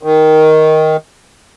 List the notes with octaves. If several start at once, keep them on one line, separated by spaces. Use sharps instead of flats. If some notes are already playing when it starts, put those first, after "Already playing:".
D#3